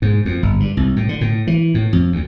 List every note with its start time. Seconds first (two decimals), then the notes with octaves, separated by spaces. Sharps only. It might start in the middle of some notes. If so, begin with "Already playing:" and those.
0.02 G#2
0.25 F2
0.43 G1
0.60 G2
0.77 C2
0.96 A2
1.09 D3
1.21 A2
1.47 E3
1.74 A2
1.93 F2
2.12 D2